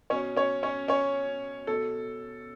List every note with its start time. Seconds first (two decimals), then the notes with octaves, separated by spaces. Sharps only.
0.10 B2 C#4 C#5
0.36 C#4 C#5
0.63 C#4 C#5
0.88 C#4 C#5
1.67 B2 A4